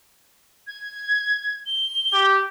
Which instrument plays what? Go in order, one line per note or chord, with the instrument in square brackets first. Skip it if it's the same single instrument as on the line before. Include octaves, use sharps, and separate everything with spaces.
[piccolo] G#6
G7
[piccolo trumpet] G4